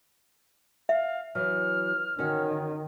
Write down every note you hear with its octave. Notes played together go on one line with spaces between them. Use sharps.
E5 F5
E3 F#3 F6
D#3 C#4 F#4 C#5